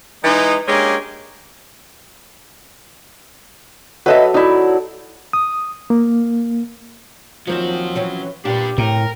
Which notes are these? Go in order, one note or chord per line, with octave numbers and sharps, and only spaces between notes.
E3 G#3 D#4
G#3 A#3 C#4 D4 G4
F#3 A4 B4 D#5 E5 D6
D#4 E4 F#4 D5
D#6
A#3
D#2 F3 F#3 C4 F#4 E5
E3 C4 C#4
A#2 D4 G4 B4
A2 C4 A#4